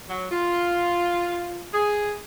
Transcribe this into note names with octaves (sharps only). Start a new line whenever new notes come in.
F#3
F4
G#4